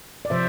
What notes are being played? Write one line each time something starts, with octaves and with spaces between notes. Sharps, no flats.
D5
C3 F3 C5 E5